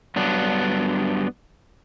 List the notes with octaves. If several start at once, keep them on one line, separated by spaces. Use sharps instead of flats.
G2 F#3 B3 D4